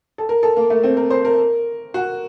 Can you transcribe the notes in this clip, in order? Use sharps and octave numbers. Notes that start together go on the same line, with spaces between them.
A4
A#4
A4
A#3
A3
C4
A#4
C5
A#4
F#4